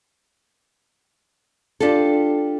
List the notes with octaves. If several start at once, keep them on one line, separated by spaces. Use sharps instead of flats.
D4 F4 G4 A4